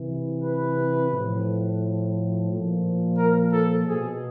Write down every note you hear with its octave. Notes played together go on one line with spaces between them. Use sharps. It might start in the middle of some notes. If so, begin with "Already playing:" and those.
Already playing: C3 E3
B4
A2 F3
A#2 F3
A#4
A4
B2 G#4